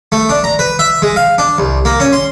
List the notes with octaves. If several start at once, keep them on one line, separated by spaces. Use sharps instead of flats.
A3
D4
A#5
B4
E5
G#3
F5
D4
C2
A#3
C#4
C6